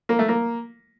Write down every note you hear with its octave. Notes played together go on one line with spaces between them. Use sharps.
A#3
A3
A#3